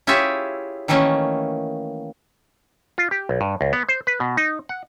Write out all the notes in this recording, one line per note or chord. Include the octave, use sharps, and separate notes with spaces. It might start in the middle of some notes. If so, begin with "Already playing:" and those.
E4 F4 G4 G#4 C#5 E5
D#3 E3 A3 A#3 C#4
F4
G4
B1
G2
C#2
B3
C5
B4
B2
D#4
F#5